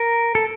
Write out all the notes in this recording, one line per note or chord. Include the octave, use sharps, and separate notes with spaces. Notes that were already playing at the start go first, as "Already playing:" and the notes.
Already playing: A#4
A4